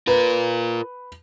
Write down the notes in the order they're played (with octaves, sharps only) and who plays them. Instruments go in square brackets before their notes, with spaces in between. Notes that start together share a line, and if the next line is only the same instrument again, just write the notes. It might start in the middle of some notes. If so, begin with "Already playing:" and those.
[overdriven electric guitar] F4 A#4 [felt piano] B4